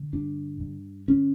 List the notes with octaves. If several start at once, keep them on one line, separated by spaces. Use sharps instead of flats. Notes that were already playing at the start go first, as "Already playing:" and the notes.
Already playing: D3
G2 D4
G2
D3 C#4